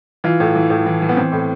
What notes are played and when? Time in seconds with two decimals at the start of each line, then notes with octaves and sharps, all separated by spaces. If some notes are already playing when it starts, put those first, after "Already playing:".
0.24 E3 F4
0.40 A2
0.55 E3
0.70 A2
0.86 E3
1.02 E3
1.09 B3
1.17 E3 C4
1.32 A2